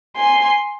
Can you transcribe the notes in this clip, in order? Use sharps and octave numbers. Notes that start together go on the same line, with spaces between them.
G#5 C6